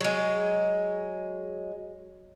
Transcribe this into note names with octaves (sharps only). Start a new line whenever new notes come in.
F#3 G#3